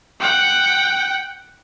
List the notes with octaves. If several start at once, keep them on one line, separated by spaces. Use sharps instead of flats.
F#5 G5